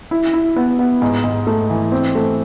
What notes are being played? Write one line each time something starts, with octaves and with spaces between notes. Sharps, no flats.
E4
E4
B3
B3
G#2
G#2
A3
E3
C4
A3